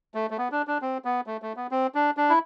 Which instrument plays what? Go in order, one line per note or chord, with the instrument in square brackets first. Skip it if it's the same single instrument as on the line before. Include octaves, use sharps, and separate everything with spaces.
[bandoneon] A3
A3
B3
D4
D4
C4
B3
A3
A3
B3
C4
D4
D4
E4